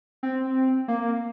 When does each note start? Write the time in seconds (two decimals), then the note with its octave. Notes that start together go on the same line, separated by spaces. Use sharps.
0.23 C4
0.88 A#3